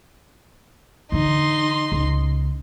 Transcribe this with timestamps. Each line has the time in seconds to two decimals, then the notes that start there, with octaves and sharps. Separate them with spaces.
1.12 D3 E3 D#4 C6
1.92 C#2